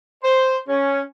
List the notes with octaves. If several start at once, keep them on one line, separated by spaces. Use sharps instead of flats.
C5
C#4